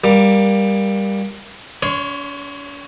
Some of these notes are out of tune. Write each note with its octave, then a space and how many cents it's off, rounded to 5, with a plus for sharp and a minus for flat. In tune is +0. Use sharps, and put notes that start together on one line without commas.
G3 +15 A#3 +15
C#4 +45 C#5 +0 C6 -20